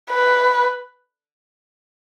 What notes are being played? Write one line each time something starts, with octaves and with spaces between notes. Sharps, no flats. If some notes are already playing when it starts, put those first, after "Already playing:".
B4